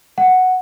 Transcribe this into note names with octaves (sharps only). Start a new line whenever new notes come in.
F#5